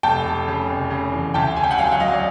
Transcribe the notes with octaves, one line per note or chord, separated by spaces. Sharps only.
F1 G5 A5
F1
C#3
F1
C#3
E2
D2 G5 A5
C#3 G#5
G5
F#5 G#5
F#3 F5 G5
F#5
F#3 D#5 F5
D5